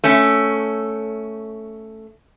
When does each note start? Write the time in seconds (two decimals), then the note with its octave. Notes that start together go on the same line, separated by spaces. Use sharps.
0.04 A3 C#4